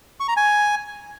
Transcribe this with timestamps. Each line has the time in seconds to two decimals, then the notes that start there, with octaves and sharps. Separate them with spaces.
0.20 C#6
0.28 A#5
0.37 G#5